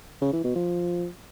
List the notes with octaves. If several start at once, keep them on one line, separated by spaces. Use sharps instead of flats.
C#3
E3
B2
F3